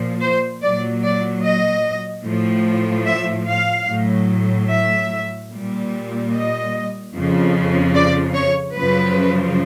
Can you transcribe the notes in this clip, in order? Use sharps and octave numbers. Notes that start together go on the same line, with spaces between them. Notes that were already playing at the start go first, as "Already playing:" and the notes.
Already playing: A#2 F3
C5
A#2 F#3 D5
D5
D#5
A2 F3
E5
F5
A2 F#3
E5
A#2 G3
D#5
F2 C#3 F3
D5
C#5
F#2 C#3 F3 B4